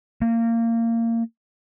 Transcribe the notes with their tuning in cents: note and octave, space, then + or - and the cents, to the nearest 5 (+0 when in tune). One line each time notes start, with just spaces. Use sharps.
A#3 -20